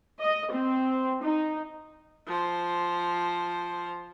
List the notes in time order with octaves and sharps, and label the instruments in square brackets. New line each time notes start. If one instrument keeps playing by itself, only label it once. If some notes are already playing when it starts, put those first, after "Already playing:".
[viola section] D#5
C4
D#4
[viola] F3 C5